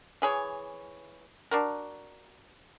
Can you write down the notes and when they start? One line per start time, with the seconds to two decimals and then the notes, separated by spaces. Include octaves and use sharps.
0.22 E3 G#4 C#5
1.51 D4 F#4 A#4